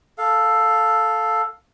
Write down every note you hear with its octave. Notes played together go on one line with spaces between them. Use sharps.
A4 F5